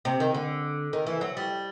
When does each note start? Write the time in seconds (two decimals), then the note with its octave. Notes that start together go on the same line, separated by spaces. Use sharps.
0.05 C3
0.20 D#3
0.35 D3
0.93 D#3
1.07 E3
1.21 F#3
1.37 G3